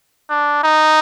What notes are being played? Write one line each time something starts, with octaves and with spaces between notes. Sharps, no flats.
D4
D#4